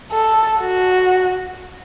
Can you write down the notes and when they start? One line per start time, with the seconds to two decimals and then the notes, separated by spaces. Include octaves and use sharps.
0.13 A4
0.61 F#4